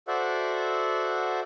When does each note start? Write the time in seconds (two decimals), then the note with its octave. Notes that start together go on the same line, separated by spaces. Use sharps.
0.08 F#4 A4 C5 D5 E5 F#5